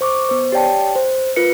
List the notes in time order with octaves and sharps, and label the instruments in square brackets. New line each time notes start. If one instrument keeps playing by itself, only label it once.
[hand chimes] C5 C#6 D6
B3 C5
G4 C#5 D5 G5 A5
C5
F4 A#4 B4 C#7